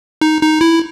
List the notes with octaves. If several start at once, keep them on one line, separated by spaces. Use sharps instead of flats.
D#4
D#4
E4